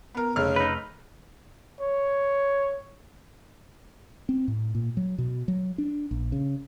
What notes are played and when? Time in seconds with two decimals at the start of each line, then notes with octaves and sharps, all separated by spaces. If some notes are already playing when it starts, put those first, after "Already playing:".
0.15 B3 A#4
0.36 F1 C#3 F6
0.56 D#4 B4
1.80 C#5
4.29 C4
4.48 A2
4.75 A#2
4.97 F#3
5.18 B2
5.48 F#3
5.78 D4
6.11 A#1
6.32 C#3